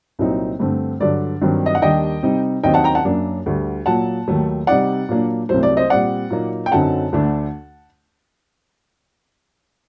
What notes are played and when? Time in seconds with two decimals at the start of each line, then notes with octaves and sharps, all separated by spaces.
0.19 C2 A#2 F#3 C4 D#4
0.59 G2 D3 A3 C4
1.00 G2 D3 F#3 D5
1.42 G2 D#3 F#3 C4
1.66 D#5
1.75 F#5
1.82 D#2 D#3 G3 D4 D#5 G5
2.23 C3 G3 C4 D#4
2.64 D#2 D#3 F#3 C4 D#4 D#5 G5
2.74 F#5 A5
2.84 G5 A#5
2.95 F#5 A5
3.05 F#2 F#3 A#3 D4
3.46 D2 D3 G3
3.86 A#2 F#3 A#3 F#5 A5
4.28 D#2 D#3 F#3 A3
4.67 C3 G3 C4 D#4 D5 F#5
5.09 A#2 F#3 A#3 D4
5.49 C2 C3 F#3 A3 C5
5.63 D5
5.77 C5 D#5
5.90 A#2 G3 C4 D5 F#5
6.30 A#2 F#3 A#3 D#4
6.66 G5
6.72 F#2 D3 F#3 C4 D#4 F#5 A5
7.12 D2 D3 A3 D4